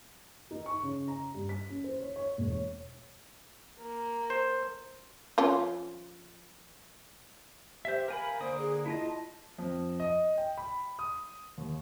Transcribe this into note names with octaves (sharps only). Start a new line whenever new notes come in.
D#4
C#6
C#3
A#5
G2
B6
C#4
C5
C#5
C#5
E1
C#5
A#3
C5
F3 C#4 F4
G4 C5 E5
A#4 F5 G#5 B5
D3 A#3 C5 D#6
G#4
E4 F4 D#5 A5
F2
D#5
G5
B5
D#6
D#2